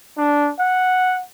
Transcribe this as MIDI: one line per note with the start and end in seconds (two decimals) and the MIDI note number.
0.17 0.50 62
0.59 1.21 78